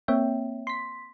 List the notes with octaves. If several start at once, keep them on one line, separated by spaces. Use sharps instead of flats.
A#3 C4 C#5 E5 G5
C6 B6